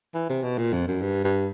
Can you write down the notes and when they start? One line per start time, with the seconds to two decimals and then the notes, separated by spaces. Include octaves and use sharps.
0.14 E3
0.29 C3
0.43 B2
0.58 A#2
0.73 F2
0.88 F#2
1.02 G2
1.24 G2